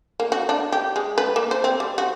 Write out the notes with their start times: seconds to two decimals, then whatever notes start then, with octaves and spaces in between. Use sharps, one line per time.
0.20 A#3
0.32 F#4
0.49 D4
0.72 G4
0.96 G#3
1.18 B4
1.36 A#3
1.51 C5
1.64 C4
1.80 G3
1.98 F#4